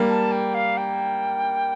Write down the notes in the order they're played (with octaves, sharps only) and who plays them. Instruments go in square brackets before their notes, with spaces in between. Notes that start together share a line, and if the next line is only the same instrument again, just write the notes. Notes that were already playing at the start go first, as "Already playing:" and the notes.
Already playing: [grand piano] G3 A#3
[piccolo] A5
G5
F5
G5